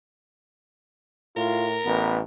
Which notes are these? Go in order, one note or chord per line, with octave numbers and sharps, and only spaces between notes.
A2 F4 A#4
A1 B3